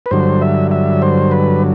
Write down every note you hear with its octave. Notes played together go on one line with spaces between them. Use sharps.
B4
G2 D3 F#3 C5
E5
E5
C5
B4